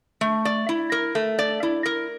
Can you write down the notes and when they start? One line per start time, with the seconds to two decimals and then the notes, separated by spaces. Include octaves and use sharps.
0.21 A3
0.45 D5
0.69 E4
0.92 A#4
1.15 A3
1.39 D5
1.63 E4
1.86 A#4